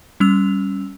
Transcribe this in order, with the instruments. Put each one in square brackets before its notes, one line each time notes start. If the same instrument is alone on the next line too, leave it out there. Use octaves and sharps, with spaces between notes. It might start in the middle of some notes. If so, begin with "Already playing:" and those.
[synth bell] G3 C#4 E6 F7